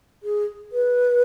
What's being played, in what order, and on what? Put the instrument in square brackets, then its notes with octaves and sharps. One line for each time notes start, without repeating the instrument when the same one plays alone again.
[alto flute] G#4
B4